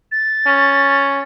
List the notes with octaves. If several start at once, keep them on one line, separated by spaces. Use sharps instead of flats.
A6
C#4